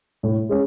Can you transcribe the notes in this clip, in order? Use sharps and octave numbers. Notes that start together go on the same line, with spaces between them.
A2
G#3 C#4